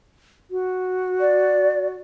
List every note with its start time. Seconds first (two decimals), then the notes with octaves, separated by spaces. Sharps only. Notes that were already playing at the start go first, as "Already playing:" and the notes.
0.51 F#4
1.20 D5